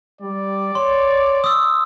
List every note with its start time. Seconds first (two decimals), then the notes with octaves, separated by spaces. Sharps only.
0.21 G3 D5
0.75 C#5 C6
1.44 D#6 E6